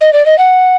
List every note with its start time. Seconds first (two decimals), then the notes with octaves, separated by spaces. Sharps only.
0.01 D#5
0.13 D5
0.26 D#5
0.38 F#5